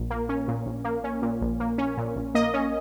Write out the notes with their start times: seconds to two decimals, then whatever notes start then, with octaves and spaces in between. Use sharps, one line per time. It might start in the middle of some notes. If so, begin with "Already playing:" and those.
Already playing: A#1 A#2
0.10 A#3
0.29 C#4
0.48 A#2
0.66 A#1
0.84 A#3
1.04 C#4
1.22 A#2
1.41 A#1
1.60 A#3
1.78 C#4
1.97 A#2
2.16 A#1
2.35 A#3 D#5
2.54 C#4